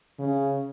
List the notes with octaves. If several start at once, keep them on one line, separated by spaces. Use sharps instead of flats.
C#3